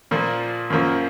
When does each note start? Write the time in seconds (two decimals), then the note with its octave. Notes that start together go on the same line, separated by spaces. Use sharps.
0.11 A#2 F3 A#3
0.70 F#2 F3 A#3